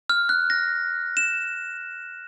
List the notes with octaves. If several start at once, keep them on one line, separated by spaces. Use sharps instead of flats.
F6
F#6
A#6
E7